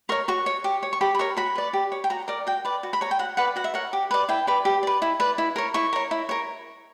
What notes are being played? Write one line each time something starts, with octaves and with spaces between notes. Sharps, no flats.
A#4 C#5 C#6
F#4 C#6
C#5
G4
C#5
C#6
G4 B5
B5
A#4 C#5 C#6
F#4 B5
B4 D5
G4
C#5
G5
F#4 A#5
A#4 D5
F#4 G5
B4 D5
F#4
B5
C#5 A#5
G5
F#4 F#5
B4 D5 F#5
F#4 F#5
E5
A#4 C#5 F#5
G4
B4 D5
E4 G5
B4 D5
G4
B4 D5
E4
B4 D5
E4
A#4 C#5
E4 C#6
A#4 C#5
E4
A#4 C#5